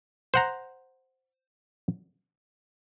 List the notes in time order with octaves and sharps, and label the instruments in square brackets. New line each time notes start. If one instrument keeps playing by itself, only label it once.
[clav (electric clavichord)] C5 F#5 A#5